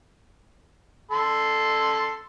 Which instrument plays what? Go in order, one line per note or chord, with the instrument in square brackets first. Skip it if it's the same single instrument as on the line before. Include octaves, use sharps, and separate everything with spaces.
[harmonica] A4 C6